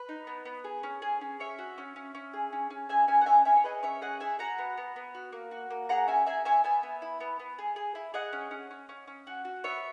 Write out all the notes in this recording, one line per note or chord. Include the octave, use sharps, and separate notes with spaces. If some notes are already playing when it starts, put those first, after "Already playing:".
Already playing: B4
D#4
B3
B3
G#4
C#4
G#4
C#4
C#4 C#5 E5
F#4
C#4
C#4
C#4
G#4
C#4
C#4
G#4 E5 G#5
C#4 E5 G#5
F#5
C#4 E5 G#5
C#4 E5 G#5
C#5
G#4 B4 D#5
C#4 C#5 E5
G#4 D#5 F#5
G#4 E5 G#5
F#4 F#5 A#5
B3
B3
B3
F#4
A#3
F#4
A#3
G#4 F#5 A#5
C#4 E5 G#5
G#4 E5 G#5
C#4 E5 G#5
B3 E5 G#5
B3
E4
B3
B3
G#4
G#4
E4
G#4 D#5 F#5
C#4
C#4
C#4
C#4
C#4
F#4
F#4
B3 C#5 E5